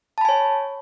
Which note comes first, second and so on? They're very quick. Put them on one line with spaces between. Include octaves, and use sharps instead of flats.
A5 B5 G#5 C#5